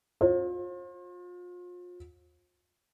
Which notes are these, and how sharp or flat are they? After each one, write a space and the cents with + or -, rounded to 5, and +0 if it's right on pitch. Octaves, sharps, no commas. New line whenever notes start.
F4 +35 C5 +40